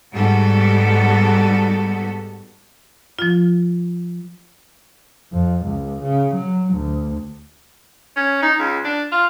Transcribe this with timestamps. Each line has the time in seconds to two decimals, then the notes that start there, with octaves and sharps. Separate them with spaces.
0.14 G#2 G3 B3 F#4 A4
3.19 F3 F4
5.33 F2
5.65 C#2
6.03 C#3
6.35 F#3
6.74 D2
8.17 C#4
8.43 D#4
8.59 C#2
8.85 D4
9.12 F4